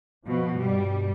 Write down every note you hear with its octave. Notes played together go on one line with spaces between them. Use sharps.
B2 F3
G2 B2 G3